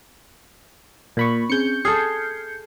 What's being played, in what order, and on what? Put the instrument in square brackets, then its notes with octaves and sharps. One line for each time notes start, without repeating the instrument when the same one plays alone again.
[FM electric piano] A#2 B5 C#6
[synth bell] C4 C#4 G#4 [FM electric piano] G6 C#7
[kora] G#4 A4 [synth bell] F6 G#6 C7